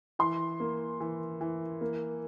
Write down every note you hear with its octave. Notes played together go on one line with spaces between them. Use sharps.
E3 C6
A#3
E3
E3
A#3